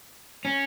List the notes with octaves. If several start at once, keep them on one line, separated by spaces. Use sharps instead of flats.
C#4